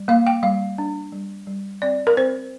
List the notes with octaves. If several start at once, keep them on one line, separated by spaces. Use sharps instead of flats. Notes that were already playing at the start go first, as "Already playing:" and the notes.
Already playing: G3
A#3 F5
G5
G3 F5
D4
G3
G3
C4 D5
A#4
C4 C5